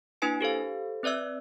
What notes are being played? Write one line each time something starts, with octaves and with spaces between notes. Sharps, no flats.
A#3 D4 E4 B4 G#5 D7
G4 A4 C5 F5
C4 B4 D5 E5 E6